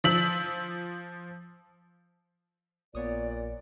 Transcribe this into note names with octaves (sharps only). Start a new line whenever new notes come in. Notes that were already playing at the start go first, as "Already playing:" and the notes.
F3 E6 B6 F#7
A#1 A#2 B3 C#5 D5 D#6